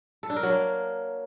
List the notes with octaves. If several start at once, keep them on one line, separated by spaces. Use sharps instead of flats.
A4
D4
A#4
F#3
A#3